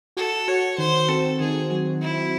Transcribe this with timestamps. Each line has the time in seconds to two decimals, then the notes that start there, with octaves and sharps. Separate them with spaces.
0.17 F#4 A4
0.48 F#4 C#5
0.78 D#3 C5
1.09 C4 A4
1.40 D#3 G#4
1.71 F#3
2.01 D#3 E4